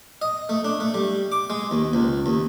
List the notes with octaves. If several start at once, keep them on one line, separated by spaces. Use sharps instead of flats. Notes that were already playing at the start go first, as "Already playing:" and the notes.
D#5
A3
D4
A3
G3
D6
G#3
D#2
C#2
D#2